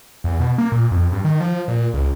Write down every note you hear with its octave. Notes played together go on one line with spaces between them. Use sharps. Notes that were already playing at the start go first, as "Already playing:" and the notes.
E2
B2
A#3
A#2
F2
G2
D#3
F3
A#2
C#2